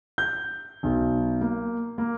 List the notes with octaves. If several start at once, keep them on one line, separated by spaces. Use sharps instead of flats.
G6
B1
A#3
A#3